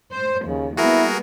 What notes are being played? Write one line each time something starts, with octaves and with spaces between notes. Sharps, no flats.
C5
D#2 C#3 F3
G3 A#3 B3 E4 F#4 G#4 A#4